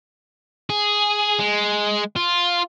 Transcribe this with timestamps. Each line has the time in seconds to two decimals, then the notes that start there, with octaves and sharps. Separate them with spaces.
0.70 G#4
1.40 G#3
2.16 F4